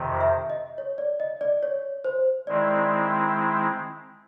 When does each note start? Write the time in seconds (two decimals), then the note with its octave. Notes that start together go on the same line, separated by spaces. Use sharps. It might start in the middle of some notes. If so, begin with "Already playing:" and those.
Already playing: F2 C3 D#3
0.21 E5
0.50 D#5
0.78 C#5
0.98 D5
1.20 D#5
1.41 D5
1.63 C#5
2.04 C5
2.47 D#3 G#3 C4 E4 D5